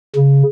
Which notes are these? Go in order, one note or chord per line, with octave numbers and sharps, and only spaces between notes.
C#3